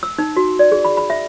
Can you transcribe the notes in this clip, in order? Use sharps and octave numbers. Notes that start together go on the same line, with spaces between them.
E6
D#4
F#4
D5
G#4
B5
B5
E5